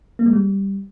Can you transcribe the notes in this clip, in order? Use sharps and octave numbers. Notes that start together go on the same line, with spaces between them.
A#3
G#3
G3